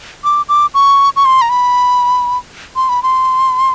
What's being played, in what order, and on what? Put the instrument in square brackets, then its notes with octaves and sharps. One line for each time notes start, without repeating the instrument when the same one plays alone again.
[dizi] D6
D6
C#6
C#6
C6
A#5
B5
C6
B5
C6